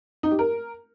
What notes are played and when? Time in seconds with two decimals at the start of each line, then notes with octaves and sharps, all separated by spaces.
0.23 D#4
0.31 G4
0.39 A#4